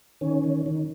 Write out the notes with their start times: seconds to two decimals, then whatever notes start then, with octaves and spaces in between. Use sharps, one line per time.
0.21 D#3 C#4
0.44 D#3
0.66 D#3